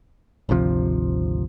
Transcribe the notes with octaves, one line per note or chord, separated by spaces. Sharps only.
G#1 D2 C3 F3